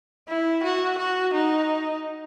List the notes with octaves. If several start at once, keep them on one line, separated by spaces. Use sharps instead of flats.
E4
F#4
F#4
D#4